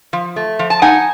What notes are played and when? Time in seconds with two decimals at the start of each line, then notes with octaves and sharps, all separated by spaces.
0.13 F3
0.36 A3
0.59 F3
0.70 A5
0.82 D#4 F#5 G#5